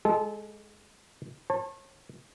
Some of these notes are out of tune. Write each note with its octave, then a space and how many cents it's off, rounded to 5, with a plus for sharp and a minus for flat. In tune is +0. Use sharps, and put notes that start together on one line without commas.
G#3 +0 A4 -25
C#5 -35 A5 +15